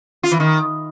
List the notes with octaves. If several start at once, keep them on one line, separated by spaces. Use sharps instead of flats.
F4
E3
D#3